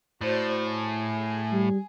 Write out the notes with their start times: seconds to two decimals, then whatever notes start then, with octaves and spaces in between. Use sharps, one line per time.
0.21 A2 F#4 C5 D5
0.69 G#4
1.52 G3